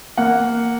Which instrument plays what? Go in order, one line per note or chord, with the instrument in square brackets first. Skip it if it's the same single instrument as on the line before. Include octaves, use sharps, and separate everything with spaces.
[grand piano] A#3 F#5